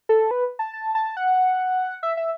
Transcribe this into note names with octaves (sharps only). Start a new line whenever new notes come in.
A4
B4
A5
A5
A5
F#5
E5
E5